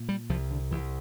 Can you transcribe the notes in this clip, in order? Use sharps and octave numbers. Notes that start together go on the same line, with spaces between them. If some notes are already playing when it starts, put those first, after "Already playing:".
Already playing: A#2
G3
C2 F3
D3
C2 E3